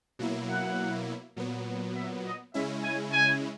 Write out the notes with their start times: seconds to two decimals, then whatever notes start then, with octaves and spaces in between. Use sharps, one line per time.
0.19 B2 F#3 A#3 E4
0.48 F#5
1.36 A#2 F#3 B3
1.96 E5
2.25 D#5
2.54 C#3 G#3 C#4 E4 E5
2.84 G#5
3.13 G#5